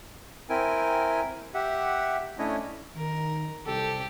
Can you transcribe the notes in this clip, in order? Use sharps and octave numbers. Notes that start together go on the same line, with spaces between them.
C4 E4 A#4 G5 G#5
G4 E5 F#5
A3 C#4 D4 E4 C#5 D#5
D#3 A#4
C2 G4 A4